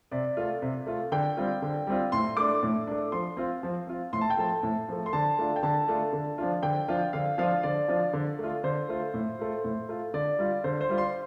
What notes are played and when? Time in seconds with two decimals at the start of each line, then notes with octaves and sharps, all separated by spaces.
0.11 C3 D5
0.37 A3 F4
0.62 C3
0.86 A3 F4
1.12 D3 G5
1.37 G3 C4 F4
1.62 D3
1.87 G3 C4 F4
2.12 A2 C6
2.37 A3 D4 D6
2.63 A2
2.87 A3 D4
3.12 F3 C6
3.37 C4 F4
3.63 F3
3.87 C4 F4
4.13 A2 C6
4.21 A5
4.30 G5
4.37 F3 A3 A5
4.63 A2
4.88 F3 A3
5.06 C6
5.13 D3 A5
5.38 A3 D4 F4
5.56 G5
5.63 D3 A5
5.88 A3 D4 F4
6.13 D3
6.38 F3 D4 F4
6.63 D3 G5
6.88 F3 D4 F4
7.13 D3 F5
7.38 F3 D4 F4 F5
7.63 D3 D5
7.88 F3 D4 F4
8.13 D3
8.39 A3 F4
8.64 D3 C5
8.89 A3 F4
9.14 A2
9.39 A3 F4
9.64 A2
9.89 A3 F4
10.14 D3 D5
10.39 G3 F4
10.64 D3 C5
10.81 C5
10.89 G3 F4
10.98 C6